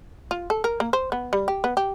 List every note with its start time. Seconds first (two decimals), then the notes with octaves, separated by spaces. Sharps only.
0.31 F4
0.50 A4
0.64 A#4
0.80 A#3
0.93 C5
1.12 B3
1.33 G3
1.48 G4
1.64 B3
1.77 G4